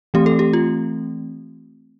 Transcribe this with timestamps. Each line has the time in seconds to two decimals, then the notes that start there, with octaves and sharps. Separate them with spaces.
0.14 E3 A3 C4 G4
0.26 A4
0.39 G4
0.53 F4